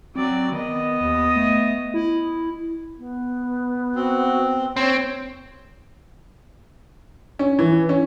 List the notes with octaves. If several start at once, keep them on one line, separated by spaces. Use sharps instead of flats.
F#3 C4 D5
D#3 B3 D#5
D#2
A3
E4
B3
C4 F#4
C4 C#5
C#4
E3
C#4